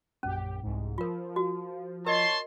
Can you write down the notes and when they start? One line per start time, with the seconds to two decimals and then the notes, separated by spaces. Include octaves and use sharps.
0.23 A#1 F#2 C#4 G4
0.62 C2 G#2
0.98 F3 F4 A#4
1.36 F#4
2.06 A#4 C#5 D#5 A5 C6